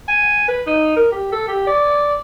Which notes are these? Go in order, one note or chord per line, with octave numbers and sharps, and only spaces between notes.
G#5
B4
D#4
A#4
G4
A4
G4
D5